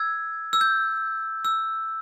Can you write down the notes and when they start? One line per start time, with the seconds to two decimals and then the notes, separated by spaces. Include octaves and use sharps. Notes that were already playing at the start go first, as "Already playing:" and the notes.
Already playing: E6 G#6
0.53 E6
0.61 G6
1.45 E6